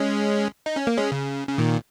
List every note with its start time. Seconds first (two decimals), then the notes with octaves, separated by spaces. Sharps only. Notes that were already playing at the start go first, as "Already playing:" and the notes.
Already playing: G#3 C#4
0.66 D#4
0.76 C#4
0.87 A#3
0.98 G#3 C#4
1.12 C#3
1.48 C#3
1.58 A#2 D#3